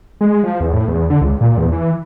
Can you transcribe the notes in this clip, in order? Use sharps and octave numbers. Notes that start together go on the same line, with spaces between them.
G#3
F3
E2
A2
E2
D3
C#2
A#2
E2
E3